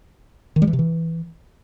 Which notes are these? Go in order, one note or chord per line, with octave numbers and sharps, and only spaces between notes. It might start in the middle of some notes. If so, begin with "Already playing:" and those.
D#3
G3
E3
C3
E3